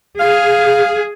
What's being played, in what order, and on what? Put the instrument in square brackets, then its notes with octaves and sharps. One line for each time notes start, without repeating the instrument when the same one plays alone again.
[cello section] G#4 [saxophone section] F5